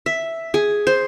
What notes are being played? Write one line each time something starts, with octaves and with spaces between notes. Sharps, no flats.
E5
G#4
C5